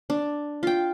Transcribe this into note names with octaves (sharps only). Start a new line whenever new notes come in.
D4
F4 G5